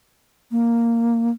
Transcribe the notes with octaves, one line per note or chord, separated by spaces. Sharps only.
A#3